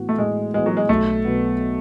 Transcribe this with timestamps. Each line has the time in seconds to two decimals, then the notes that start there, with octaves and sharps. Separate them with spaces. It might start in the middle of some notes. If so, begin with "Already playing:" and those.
Already playing: A2 E3 B3 F#4
0.09 A3
0.18 A2 G#3
0.54 E3 G#3 B3 F#4
0.66 F#3
0.77 G#3
0.89 B1 A3
1.25 B2 F#3 B3